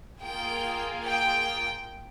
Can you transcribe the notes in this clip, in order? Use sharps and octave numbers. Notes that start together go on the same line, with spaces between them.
A#3 F4 G#4 G5
G5